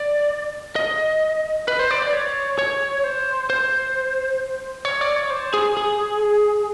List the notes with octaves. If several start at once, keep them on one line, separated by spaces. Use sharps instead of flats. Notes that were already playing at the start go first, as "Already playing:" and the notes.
Already playing: D5
D#5
B4
C5
D5
D5
C#5
C#5
C5
C5
C#5
D5
C#5
C5
G#4
G#4